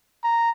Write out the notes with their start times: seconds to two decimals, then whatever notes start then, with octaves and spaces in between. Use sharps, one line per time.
0.24 A#5